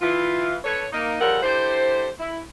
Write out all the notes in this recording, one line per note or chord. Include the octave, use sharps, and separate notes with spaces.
E3 F4
D3 A4 B4 C#5
A#3 D#4
C#3 F3 G3 A4 A#4 F#5
D3 E4 G4 C5
E4